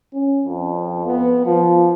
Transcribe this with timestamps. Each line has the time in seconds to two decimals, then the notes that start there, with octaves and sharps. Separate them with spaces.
0.13 C#4
0.45 F2
1.06 B3
1.46 F3